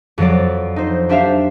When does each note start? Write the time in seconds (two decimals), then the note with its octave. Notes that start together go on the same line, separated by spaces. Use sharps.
0.18 F2 F3 F#3 D5
0.76 D#4 C5
1.09 D4 G4 C5 E5 F5